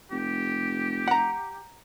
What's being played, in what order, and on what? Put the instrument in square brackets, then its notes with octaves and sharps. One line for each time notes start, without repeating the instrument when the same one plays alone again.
[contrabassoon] F1 [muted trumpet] G4
[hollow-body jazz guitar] F#5 A#5